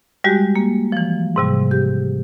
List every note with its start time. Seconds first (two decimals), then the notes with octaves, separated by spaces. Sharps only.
0.24 G3 G#3 F#4 G4
0.55 A#3
0.92 E3 F3
1.36 G#2 C3 G3
1.71 G4